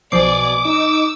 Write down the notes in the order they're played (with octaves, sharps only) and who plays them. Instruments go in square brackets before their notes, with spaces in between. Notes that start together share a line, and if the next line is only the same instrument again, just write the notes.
[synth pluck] B1 F3 C7 [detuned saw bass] B2 [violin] D5 G#5 [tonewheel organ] D6
[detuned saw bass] D#4 [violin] E6